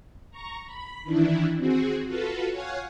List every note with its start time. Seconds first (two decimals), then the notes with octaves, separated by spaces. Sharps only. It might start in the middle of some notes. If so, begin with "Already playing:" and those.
0.31 A#5 C#6
0.66 B5
1.03 D#3 E3 D4 E4
1.57 C4 F#4 G#4
2.06 F4 F#4 A4 B4
2.50 C#5 F5 F#5 G#5